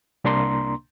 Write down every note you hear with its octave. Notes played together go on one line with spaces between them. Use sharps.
C2 A#3 D4 A#5 C6